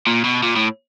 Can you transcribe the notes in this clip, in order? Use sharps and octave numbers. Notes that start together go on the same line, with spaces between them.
A#2
B2
A#2
A2